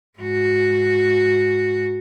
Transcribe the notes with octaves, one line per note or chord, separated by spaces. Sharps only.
G#2 F#4